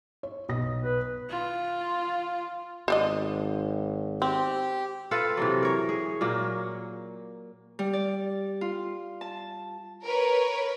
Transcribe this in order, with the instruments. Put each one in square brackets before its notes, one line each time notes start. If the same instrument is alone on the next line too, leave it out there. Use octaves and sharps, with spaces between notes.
[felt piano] C#5
B1 D#6 A#6
[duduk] B4
[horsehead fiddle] F4
[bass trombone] G#1 [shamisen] C5 D5 D#5
[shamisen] C4 [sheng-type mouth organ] G4
[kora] F4 A4 B4 F5
C3 E3 F#3
A#4 C#5
G#4
A#2 F#3 A#3
[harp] G3
D5
F4
A5
[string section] A#4 B4 C#5